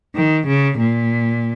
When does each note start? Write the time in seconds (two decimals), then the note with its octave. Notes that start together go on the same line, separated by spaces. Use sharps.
0.15 D#3
0.47 C#3
0.78 A#2